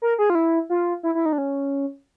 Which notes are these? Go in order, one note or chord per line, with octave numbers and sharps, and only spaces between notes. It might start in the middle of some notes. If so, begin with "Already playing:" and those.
A#4
G#4
F4
E4
F4
E4
E4
D#4
D4
C#4